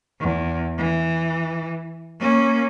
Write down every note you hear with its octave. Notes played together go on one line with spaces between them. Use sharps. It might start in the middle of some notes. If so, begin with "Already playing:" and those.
E2
E3
A#3 C#4